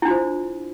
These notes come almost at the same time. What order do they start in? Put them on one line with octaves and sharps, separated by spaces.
E4 D4 F4 C5